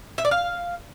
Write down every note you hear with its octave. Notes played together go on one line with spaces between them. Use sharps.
E5
D5
F5